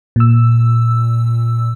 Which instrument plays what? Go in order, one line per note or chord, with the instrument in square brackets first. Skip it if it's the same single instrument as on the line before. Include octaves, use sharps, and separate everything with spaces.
[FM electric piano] A#2 E6